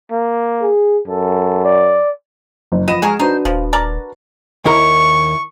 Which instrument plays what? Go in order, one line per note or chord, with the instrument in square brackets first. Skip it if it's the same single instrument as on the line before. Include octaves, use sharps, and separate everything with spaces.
[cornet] A#3
[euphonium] G#4
[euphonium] F#2 [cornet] A4
[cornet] D5
[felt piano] F#1
[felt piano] F3 D#7 E7 [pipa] B3 D#5
[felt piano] G#3 [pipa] F#4 G#4 A#4
[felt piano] D4 F#4 B4 [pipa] D#4 C5
[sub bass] D#1 [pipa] F3
[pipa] A#4 D5 A5
[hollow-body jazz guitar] D#2 E4 A#4 [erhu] C#6